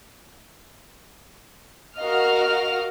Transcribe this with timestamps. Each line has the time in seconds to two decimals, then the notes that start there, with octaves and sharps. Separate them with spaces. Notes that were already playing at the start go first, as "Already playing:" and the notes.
1.98 F#4 A#4 D#5 F5 F6